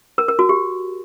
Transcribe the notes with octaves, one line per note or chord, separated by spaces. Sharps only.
A#4
A#4
F#4
G4